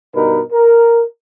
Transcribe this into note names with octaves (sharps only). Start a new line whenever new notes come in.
G2 B2 D#4 A#4 B4
A#4